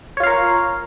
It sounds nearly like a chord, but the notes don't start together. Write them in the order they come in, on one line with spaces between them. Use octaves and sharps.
C#5 F4 F5 A#4